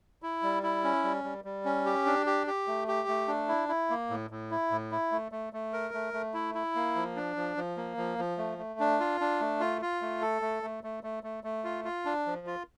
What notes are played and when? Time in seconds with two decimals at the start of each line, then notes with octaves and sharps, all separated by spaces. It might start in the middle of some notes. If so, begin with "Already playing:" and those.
0.23 E4
0.43 G3
0.63 E4
0.84 C#4
1.04 G3
1.24 G3
1.44 G3
1.65 C#4
1.86 G4
2.06 D4
2.26 G4
2.47 G4
2.68 A3
2.88 G4
3.08 A3
3.28 D4
3.48 E4
3.69 E4
3.90 A#3
4.10 A2
4.30 A2
4.51 E4
4.71 A2
4.92 E4
5.12 A3
5.32 A3
5.53 A3
5.73 A#4
5.94 A3
6.14 A3
6.34 E4
6.55 E4
6.75 A#3
6.95 F3
7.16 D4
7.36 F3
7.57 F3
7.77 A#3
7.97 F3
8.19 F3
8.38 A3
8.58 A3
8.80 D4
9.00 F4
9.21 D4
9.40 A3
9.60 F4
9.82 F4
10.02 A3
10.22 A4
10.42 A3
10.63 A3
10.84 A3
11.04 A3
11.23 A3
11.44 A3
11.64 F4
11.85 F4
12.05 D4
12.26 F3
12.47 F4